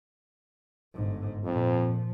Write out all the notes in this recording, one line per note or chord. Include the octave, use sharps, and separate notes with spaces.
G1 G#2
F2 A#2 F3